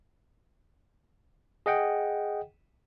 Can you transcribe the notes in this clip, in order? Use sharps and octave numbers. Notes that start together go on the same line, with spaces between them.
G#4 D#5 F#5 G5